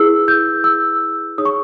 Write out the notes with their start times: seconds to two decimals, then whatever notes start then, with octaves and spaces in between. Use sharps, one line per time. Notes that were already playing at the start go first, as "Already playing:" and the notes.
Already playing: E4 G#4 B4 E6
0.28 G6
0.64 E6
1.38 D#4 G#4 C#5 D#6
1.45 C#6